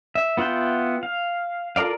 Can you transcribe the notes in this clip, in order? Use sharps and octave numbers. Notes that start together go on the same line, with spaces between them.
E5
B3 F4 E5 F#5 G5
F5
F4 A4 A#4 D5 F5